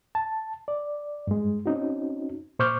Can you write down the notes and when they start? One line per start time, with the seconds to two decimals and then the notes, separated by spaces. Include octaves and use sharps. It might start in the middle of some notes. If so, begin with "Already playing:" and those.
0.15 A5
0.68 D5
1.27 G2 G#3
1.66 C4 C#4 D#4 F#4
2.59 A#2 C5 C#6 D6 F6 G6